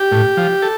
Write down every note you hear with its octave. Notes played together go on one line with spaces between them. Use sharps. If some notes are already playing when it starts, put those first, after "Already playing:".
Already playing: G4
A2
F3
A4